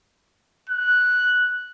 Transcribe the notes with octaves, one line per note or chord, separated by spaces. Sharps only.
F#6